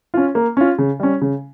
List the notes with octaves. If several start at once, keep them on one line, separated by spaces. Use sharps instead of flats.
C#4 F4
A#3
C#4 F4
C#3
G3 C#4
C#3